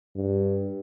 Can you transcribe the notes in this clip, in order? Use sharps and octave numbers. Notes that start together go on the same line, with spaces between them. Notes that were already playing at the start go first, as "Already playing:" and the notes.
G2